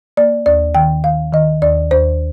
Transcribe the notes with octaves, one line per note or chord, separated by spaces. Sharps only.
A#3 D5
D#2 D5
D#3 G5
D#3 F5
D#3 D#5
D#2 D5
D#2 C5